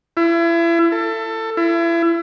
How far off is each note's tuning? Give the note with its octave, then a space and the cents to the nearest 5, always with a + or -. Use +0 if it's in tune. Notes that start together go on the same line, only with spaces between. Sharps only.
E4 +35
A4 +20
E4 +35